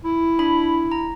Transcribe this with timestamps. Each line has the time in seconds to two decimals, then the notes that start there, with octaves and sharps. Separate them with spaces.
0.04 E4
0.39 D4 B5
0.92 A#5